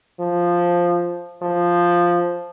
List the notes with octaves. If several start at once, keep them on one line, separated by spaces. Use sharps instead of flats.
F3
F3